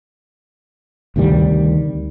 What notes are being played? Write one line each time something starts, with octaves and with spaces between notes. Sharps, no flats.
D2 C3 D#3 G3